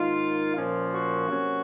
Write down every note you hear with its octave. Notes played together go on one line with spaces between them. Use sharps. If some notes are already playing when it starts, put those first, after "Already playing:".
Already playing: G#2 D#3 A#3 D#4 F4
A#2 F3 A#3 C#4 F4
F#4
C3 F#3 A#3 C#4